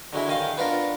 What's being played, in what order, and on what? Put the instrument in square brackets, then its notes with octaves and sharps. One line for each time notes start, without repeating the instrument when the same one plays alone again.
[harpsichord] D3 F#3 G#3 E4
D#3 D#5 F5
B3 D4 F4 A#4